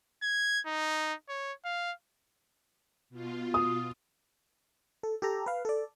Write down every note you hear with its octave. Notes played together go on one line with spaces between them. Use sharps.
G#6
D#4
C#5
F5
B2 F4
D#6
A4
G4 A4 A#5
B4 F5
A4 D5